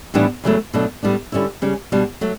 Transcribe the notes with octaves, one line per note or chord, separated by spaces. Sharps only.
A2 E3 G3 B3 D4
E2 C#3 F#3 A3
B2 F#3 A3 D4
A2 G3 B3 D4
D3 G3 C#4 E4
C#3 G3 C#4
B2 G3 B3 D4
F#3 A3